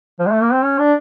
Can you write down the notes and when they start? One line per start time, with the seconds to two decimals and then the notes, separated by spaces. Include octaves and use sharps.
0.19 F3
0.26 G#3
0.31 A3
0.42 A#3
0.52 C4
0.64 C#4
0.79 D4